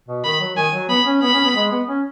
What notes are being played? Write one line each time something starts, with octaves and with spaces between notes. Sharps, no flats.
B2
D#3 B5
F#3
D#3 G#5
F#3
B3 B5
C#4
B3 B5
C#4
B3
G#3
B3
C#4